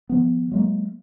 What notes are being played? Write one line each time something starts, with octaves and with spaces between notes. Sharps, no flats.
D#3 F3 B3
F#3 G#3 A#3